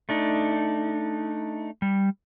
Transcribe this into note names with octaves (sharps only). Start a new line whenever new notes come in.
A3 D4 D#4
G3